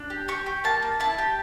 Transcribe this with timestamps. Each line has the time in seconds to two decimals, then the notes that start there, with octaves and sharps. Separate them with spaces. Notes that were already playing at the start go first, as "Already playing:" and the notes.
Already playing: D4
0.10 G4
0.28 G4 C#6
0.46 G4
0.64 A#3 A5
0.82 A#3
1.00 E4 A5
1.18 G4